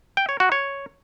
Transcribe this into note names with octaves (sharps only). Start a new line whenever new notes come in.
G5
C#5
F#4
C#5